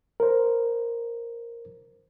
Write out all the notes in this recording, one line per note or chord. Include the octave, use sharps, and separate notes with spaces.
A#4 C5